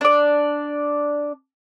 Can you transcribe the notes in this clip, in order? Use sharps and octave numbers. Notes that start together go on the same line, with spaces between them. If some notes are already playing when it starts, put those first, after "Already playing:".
D4 D5